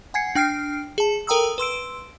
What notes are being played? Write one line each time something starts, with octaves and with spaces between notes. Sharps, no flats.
F#5 G#5 G#6 C7 C#7
D4 G5 F6 C7 D7
G#4 A5
A4 A#4 G5 A#5 D#6 E6
B4 C6 E6 D7